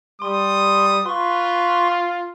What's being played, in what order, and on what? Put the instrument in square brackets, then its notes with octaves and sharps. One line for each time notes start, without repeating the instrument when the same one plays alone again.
[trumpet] G3 [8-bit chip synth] C6 [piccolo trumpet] D#6
[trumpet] F4 [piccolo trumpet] B4 [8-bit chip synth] C6 C#6